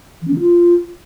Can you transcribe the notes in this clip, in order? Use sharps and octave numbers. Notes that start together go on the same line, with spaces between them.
E3
C#4
D#3
F4